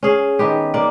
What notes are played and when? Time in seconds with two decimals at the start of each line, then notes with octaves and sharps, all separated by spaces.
0.03 C#4 G#4 F5
0.39 D#3 B3 G4
0.74 A#3 D5